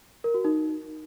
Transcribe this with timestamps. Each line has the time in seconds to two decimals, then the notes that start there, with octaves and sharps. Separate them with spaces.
0.24 A#4
0.34 F#4
0.45 D#4